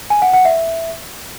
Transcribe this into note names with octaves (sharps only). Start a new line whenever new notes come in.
G#5
F#5
F#5
E5